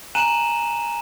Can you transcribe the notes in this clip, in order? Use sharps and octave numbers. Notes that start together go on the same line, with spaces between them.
G#5 A#5 F#6 D#7 E7 F#7